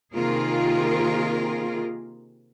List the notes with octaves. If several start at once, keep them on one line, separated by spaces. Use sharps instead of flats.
C3 D#3 A#3 F4 G#4 A#4